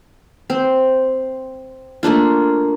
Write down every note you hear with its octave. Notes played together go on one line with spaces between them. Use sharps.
C4
A3 A#3 D4 F4